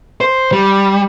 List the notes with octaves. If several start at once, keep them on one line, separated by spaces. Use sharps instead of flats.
C5
G3